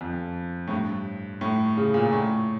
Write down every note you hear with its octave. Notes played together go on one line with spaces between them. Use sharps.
F2
A2
G2
A2
C#3
A#2
A2